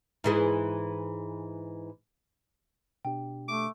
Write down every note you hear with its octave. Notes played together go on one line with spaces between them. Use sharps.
G#2 E3 G#4
B2 D4 G4 G5
A3 D6